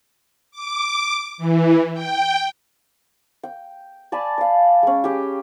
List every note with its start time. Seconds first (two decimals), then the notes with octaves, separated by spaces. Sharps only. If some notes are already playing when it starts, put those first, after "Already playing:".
0.51 D6
1.38 E3
1.93 G5
3.43 G5
4.12 D5 G#5 A5 B5
4.38 D5 F5
4.83 G#3 C#4
5.04 G4 G#4 G5